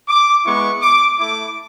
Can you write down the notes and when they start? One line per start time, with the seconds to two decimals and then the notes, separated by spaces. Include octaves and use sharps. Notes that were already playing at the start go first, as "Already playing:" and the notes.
0.08 D6
0.45 G#3 B3 E4 C#6
0.82 D6
1.18 A3 E4 D6